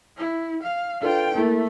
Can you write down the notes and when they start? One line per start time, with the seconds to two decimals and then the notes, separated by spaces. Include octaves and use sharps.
0.17 E4
0.63 F5
1.02 D4 F4 A4 B4 G5
1.35 A3 A#3 E4 A#4